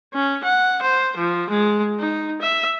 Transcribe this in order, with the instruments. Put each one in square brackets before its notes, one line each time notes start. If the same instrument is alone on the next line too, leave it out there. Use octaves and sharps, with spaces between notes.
[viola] C#4
F#5
C5
F3
G#3
D#4
E5